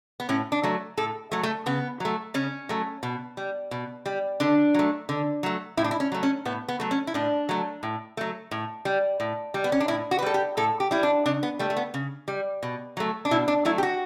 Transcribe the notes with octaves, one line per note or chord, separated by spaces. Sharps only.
B3
A2 C#4
D4
F#3 A3
A2 A4
F#3 A3
A3
C#3 B3
F#3 A3
C#3 C#4
F#3 A3
B2
G3
B2
G3
D3 D4
F#3 A3
D3
F#3 A3
A2 E4
D4
E4
C#4
F#3 A3
C#4
A2 B3
B3
F#3 A3
C#4
E4
A2 D4
F#3 A3
A2
F#3 A3
A2
G3
A2
G3
B3
C#4
D4
A2 E4
F#4
B4
G3 A4
G4
A2 A4
G4
G3 E4
D4
C#3 D4
B3
G3 A3
A3
B3
C#3
G3
B2
F#3 A3
D4
B2 E4
D4
F#3 A3 E4
G4
F#4